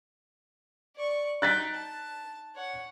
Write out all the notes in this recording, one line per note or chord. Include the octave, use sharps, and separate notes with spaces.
D5 C#6
D#4 G5 F#6 A6 B6
A5
C#5 F#5